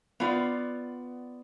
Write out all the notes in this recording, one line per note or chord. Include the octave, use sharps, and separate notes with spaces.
B3 F4 D5